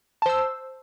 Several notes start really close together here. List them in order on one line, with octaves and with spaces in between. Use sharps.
A5 C5 E6